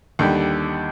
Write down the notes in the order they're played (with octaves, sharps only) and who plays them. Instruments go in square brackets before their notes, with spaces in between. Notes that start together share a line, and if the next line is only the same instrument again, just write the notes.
[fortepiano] D#2 D3 G3